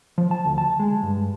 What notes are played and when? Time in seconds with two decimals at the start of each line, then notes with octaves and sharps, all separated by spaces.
0.18 F3
0.31 A5
0.46 D2
0.58 A5
0.79 G#3
1.03 G2